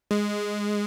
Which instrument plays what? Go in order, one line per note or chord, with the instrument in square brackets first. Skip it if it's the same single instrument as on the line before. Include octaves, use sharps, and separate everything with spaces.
[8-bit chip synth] G#3